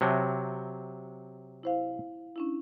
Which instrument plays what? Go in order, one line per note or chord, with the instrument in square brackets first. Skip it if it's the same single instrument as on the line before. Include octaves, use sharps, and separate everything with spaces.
[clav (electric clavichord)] C3 F#3 [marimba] E5 A5
[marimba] E4 C5 F5
C#4 D4 E4